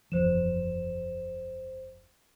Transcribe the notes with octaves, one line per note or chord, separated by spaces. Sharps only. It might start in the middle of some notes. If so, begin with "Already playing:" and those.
F#1 E2 F3 C5 E7